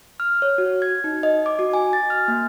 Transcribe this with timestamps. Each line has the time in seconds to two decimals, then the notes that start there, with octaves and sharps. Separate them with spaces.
0.20 F6
0.42 C#5
0.58 F#4
0.82 G#6
1.04 D#4
1.23 D#5
1.46 D6
1.59 F#4
1.73 G#5
1.93 A6
2.10 F6
2.28 A#3